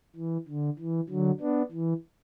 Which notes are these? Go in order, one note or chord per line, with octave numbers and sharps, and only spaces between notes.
E3
D3
E3
D3 F#3
B3 D4
E3